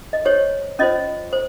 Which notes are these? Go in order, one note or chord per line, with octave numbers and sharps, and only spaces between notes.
D#5
G4 C5 C#5
C#4 F4 C5 D#5
C5